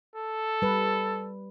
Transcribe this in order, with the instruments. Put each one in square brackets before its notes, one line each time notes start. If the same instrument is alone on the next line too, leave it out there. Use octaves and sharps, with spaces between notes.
[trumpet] A4
[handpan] G3 B4